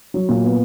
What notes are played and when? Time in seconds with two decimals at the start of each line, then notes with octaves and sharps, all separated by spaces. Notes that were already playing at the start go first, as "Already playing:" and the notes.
0.14 F#3
0.29 A#2
0.44 B3